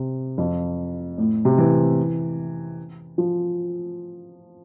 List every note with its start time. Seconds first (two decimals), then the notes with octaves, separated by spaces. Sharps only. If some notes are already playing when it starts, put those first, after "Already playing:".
Already playing: C3
0.38 F2
1.18 A2
1.45 C3
1.58 E3
3.18 F3